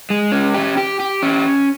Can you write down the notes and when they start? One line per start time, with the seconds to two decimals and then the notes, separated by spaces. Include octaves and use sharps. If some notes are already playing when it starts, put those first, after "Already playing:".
0.10 G#3
0.32 C#4
0.55 G4
0.77 G4
1.00 G4
1.23 C#4